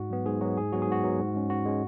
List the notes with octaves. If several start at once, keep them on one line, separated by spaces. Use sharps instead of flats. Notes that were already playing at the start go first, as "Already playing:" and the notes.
Already playing: G#2 F#4
F#3 B3
G#2 G#4
F#3 B3 F#4
G#2 G#4
F#3 B3 F#4
G#4
G#2 F#4
F#3 B3
G#2
G#3 C#4
G#2 F#4
G#3 C#4